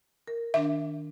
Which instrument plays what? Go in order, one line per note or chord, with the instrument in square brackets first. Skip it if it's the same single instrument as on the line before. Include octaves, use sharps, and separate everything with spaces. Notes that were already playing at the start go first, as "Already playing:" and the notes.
[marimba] A#4
[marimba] D#3 D4 [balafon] E5